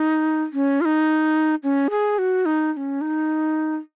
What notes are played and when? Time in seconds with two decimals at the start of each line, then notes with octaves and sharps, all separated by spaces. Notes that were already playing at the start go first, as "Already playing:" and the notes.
Already playing: D#4
0.53 C#4
0.81 F4
0.85 D#4
1.63 C#4
1.90 G#4
2.18 F#4
2.46 D#4
2.73 D#4
2.77 C#4
3.01 D#4